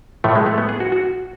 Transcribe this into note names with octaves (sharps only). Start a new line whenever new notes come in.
A2 F3 A3
G#3
A3
B3
G#4
F#4
F#4